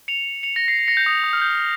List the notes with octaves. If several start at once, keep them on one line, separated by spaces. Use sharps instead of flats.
C#7 F7
C#7 F7
A#6 C#7
C7
C7
A#6 C#7
G6
D#6
D#6
F6
G6